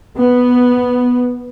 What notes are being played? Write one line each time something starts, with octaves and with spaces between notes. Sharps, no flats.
B3